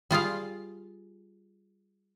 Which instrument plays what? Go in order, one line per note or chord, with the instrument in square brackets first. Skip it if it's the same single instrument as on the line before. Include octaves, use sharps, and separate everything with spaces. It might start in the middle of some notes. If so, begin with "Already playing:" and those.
[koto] G3 F4 G#4 F5